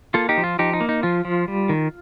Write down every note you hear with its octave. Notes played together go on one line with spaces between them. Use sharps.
A#3 F4 A4
D#4 G4
F3
F4
F3 D#4 G4
D#4
A#3
D#4
F3 F4
F3
G3
D#3